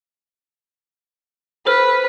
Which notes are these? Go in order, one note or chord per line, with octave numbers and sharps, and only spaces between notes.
A4 B4 C5 F6